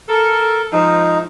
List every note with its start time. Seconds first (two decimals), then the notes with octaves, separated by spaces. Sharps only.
0.08 A4 A#4
0.72 F2 G#2 F3 D#4